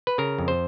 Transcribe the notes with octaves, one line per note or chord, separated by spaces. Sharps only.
B4
C#3 A#4
F2
C5